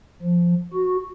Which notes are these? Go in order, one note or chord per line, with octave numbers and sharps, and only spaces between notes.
F3
F#4